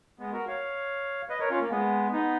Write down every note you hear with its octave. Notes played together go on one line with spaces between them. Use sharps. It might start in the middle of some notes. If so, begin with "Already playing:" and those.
G#3 B3
F#4 A#4
C#5 F5
B4 D#5
A#4 C#5
C#4 F4
A#3
G#3 B3
B3 D#4